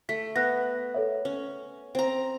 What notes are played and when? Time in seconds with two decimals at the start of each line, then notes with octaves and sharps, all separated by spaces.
0.09 A3 B6
0.36 B3 F#6 A#6
0.94 A4 C#5 E5
1.25 C#4
1.95 C4 A#5